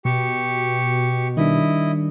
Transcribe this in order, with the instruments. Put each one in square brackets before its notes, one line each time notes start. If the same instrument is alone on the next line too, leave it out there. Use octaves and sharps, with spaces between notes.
[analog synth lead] B2 [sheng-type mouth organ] G4 C#6
[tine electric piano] D#3 G3 D4 [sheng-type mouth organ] E4 D#5